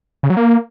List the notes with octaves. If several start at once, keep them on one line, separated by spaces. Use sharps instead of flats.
C#3
F#3
A#3